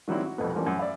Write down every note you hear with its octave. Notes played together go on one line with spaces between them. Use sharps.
D#3 F#3 G3 C4 E4
F#4
C2 F2 B2 A3 B3
E3 F3 G3 A#3 C#4
F#2
D5 E5 F5 B5